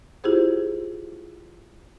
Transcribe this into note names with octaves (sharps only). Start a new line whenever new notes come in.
E4 F4 G4 G#4 C5